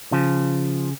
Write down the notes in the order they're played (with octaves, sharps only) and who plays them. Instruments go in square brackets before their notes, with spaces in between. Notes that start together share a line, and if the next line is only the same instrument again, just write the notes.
[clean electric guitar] C#3 F3